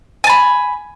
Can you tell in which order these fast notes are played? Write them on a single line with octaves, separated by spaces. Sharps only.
G#5 A5 B5